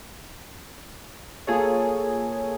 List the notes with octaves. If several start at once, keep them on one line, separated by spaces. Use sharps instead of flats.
A#3 F4 G#4 A4 C#5